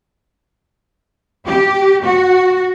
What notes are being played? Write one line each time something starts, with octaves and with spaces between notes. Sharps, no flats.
G4
F#4